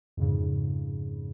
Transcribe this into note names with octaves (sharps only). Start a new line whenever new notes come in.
F2 G#2 C#3